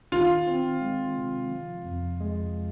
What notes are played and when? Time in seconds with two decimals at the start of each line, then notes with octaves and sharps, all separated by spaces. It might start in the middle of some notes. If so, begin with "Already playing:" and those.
0.12 D#3 F4
0.47 C4
0.81 G#3
1.16 C3
1.51 F3
1.85 F2
2.20 G#3